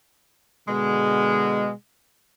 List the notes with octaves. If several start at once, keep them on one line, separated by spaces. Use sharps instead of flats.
B2 D3 G#3